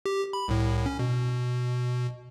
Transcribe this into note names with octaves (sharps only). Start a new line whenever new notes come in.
G4
B5
C2 A2
C#4
B2